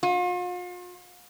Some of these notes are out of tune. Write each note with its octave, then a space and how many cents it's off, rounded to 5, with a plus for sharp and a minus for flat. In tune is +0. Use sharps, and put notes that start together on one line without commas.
F4 +40